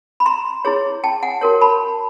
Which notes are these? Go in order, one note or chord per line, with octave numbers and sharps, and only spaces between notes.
B5
A#5 C6
E4 G#4 C#5
G5 A5
F#5 G#5
F#4 A#4 C#5
A5 B5